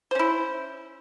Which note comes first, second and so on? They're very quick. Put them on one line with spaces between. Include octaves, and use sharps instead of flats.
C5 C#4 E4